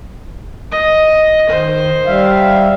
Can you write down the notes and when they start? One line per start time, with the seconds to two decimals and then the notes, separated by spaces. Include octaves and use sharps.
0.71 D#5
1.49 D#3 C5
2.06 G3 E5 F5